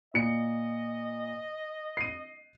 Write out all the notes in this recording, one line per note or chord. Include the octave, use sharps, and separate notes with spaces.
A#2 D#5 C#7
C7 D#7